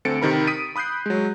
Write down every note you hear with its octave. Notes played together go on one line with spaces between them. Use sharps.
D2 C4 A4 A6 C#7 D7
C3 D#3 A#4 B5
D#6 B6 D7 D#7
B5 D#6 F#6 G6 C7
F#3 G#3